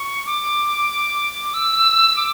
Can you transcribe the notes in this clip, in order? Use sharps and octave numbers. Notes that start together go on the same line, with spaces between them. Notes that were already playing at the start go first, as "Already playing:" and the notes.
Already playing: C#6
D6
E6
D6